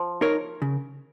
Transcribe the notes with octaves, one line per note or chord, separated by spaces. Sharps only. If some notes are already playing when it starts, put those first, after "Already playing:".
Already playing: F3
D#4 A#4 C#5
C#3